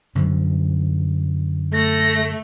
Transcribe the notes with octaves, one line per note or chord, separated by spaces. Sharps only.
F#2 D3 F3
A3 A#6